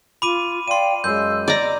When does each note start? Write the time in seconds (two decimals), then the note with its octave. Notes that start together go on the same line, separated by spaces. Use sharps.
0.22 F4 B5 D6 D#7
0.68 D5 F5 G5 C6 D#7
1.04 F#2 G#3 C6 E6 G6
1.48 D5 D#5 A#5